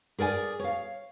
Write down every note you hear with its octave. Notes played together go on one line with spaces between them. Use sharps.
G#4 A#4 D5 G5 G#5
C#5 F5